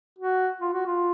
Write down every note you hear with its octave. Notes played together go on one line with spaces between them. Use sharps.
F#4
F4
F#4
F4